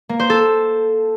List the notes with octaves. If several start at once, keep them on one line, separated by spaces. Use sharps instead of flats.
A#3
C5
A4